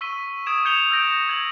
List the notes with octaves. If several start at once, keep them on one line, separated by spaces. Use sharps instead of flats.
C#6 E6 B6 D#7 G7
D#6 G#6 D7 E7
G6 G#6 C#7 E7 F7 G7
E6 G6 A#6 D7
G#6 F#7